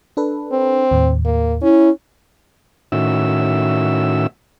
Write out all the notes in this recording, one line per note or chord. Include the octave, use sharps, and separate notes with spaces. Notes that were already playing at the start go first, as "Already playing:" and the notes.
D4 A4 B4
C4
D#2 A2
A#3
C#4 E4
A2 D#3 C#4 F#4 E5 E6